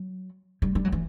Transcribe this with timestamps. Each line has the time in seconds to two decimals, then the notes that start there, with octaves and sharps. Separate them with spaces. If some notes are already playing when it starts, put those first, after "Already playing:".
Already playing: F#3
0.62 G3
0.75 G3
0.85 F#3
0.92 E3